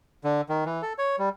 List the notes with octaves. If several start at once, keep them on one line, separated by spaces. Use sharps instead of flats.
D3
D#3
E3
A4
C#5
G3